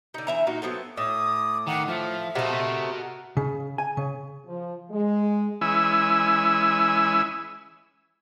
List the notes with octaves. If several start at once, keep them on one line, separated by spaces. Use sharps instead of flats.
D3 D#4
E3 E5 A#5
A#2 D#4 F#4
F#3 B3 C4 A4
A2 D6 D#6
D#3 F#5
F3 F4 E5
C3 A3 F#4 A#4 D#5
C#3
G#5
C#3
F3
G#3
E3 G#3 C#4 E4 G#5 E6